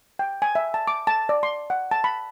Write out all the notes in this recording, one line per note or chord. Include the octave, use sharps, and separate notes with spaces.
G5
G#5
E5
A5
D6
A5
D5
C6
F#5
A5
B5